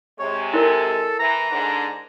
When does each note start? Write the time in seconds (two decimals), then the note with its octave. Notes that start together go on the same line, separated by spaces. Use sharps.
0.19 C3 G#3 C#5
0.53 E4 A4 A#4
1.19 E3 A#5
1.51 G#2 D3 D4